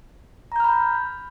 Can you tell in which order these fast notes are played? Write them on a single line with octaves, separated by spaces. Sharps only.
A#5 G6 F6 B5